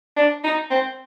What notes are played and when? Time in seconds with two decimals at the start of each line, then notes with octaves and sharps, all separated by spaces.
0.17 D4
0.44 D#4
0.71 C4